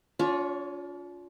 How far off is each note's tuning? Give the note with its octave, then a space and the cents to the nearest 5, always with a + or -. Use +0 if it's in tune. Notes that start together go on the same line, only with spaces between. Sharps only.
D4 -45 F4 +20 C#5 +0